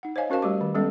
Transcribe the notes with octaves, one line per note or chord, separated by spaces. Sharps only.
D#4 F#5
C5 C#5 D#5 F5 G#5
C#4 F#4 A#4 C5 F5 A5
G3 A3 G4 D6
D#3
G3 G#3 B3 C#4 A4 E5